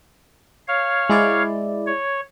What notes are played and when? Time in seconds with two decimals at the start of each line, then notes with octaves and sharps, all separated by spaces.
0.68 C#5 F5
1.10 G#3 E4 D5
1.86 C#5